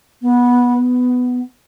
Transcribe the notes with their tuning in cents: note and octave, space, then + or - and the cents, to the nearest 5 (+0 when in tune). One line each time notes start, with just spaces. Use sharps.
B3 -15
B3 +10